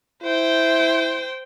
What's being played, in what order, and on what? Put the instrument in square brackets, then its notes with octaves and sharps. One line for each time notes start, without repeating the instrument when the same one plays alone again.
[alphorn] E4 [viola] C5 G5